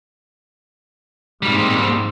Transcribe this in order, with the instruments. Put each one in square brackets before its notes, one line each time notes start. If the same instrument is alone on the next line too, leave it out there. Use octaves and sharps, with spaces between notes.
[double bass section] G#2 C4 [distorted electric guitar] G3 A#3